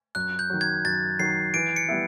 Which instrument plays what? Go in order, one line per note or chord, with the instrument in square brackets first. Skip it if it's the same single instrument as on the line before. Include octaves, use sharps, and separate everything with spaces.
[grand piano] F#2 [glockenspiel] F#6
[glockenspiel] G6
[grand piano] D#3 F#3
[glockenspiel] G#6
[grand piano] F#2 [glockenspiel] A6
[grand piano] D#3 F#3 [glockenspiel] C7
[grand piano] E3 [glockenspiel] D7
[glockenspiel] C#7
[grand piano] G3 B3 E4